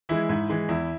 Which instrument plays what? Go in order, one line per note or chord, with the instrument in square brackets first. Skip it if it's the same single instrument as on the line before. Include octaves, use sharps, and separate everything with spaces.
[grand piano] E3 G#3 E4
G#2
E3 G#3
E2 E4